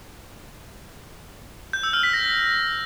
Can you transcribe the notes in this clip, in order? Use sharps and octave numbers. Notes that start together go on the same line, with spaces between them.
G6
E6
F6
B6
A#6